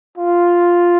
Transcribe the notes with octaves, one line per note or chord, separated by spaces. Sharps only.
F4